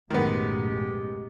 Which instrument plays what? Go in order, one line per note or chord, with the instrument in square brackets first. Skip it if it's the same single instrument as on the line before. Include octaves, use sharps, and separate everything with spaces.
[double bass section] A1 F#2 B2 [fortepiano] D#3 B3 [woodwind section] G#3 G4